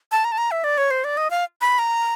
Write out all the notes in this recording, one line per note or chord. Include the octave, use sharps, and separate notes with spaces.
A5
A#5
A5
A#5
E5
D5
C#5
C5
D5
D#5
F5
B5
A#5